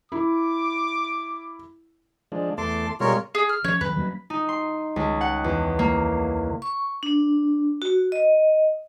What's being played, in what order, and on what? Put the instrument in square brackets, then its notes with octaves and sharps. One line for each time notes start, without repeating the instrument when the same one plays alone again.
[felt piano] E4 [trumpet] D6
[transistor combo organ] F3 G#3 D4
[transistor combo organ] E2 A3 A5 [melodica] C6 D6
[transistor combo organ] B2 G3 G#3 [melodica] F4 A#4 C#5
[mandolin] G#4
F6
[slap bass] F3 C#4 [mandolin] C#5
[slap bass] D#2 F#3 [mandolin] B4
[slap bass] F#3 A#3 C#4
[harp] D#4
C6
C#2
F#5
E2
A#3
[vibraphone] C#6
D4
F#4
D#5